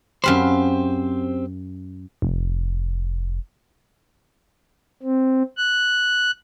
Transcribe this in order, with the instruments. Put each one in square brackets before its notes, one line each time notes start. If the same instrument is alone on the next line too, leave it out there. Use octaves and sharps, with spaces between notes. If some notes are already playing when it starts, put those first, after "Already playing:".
[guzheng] F#2 F5 B5 [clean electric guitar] C4 G4 C5
[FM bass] F1
[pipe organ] C4
F#6